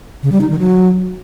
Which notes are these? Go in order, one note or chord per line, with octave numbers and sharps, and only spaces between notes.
C#3
G3
D#4
D#3
F#3